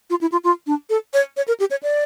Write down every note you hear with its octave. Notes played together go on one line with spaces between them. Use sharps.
F4
E4
F4
F4
D4
A4
C#5
C#5
A#4
G4
C#5
D5